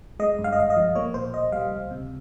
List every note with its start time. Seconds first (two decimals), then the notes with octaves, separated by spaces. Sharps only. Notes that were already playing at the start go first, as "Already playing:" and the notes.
0.19 G#3 D#5
0.38 G2
0.44 F5
0.52 D#5
0.57 G#1 F5
0.70 D#5
0.76 F3
0.95 A#3 C#5
1.14 A#2 C5
1.34 C2 D#5
1.52 G3 F5
1.72 C#2
1.91 C3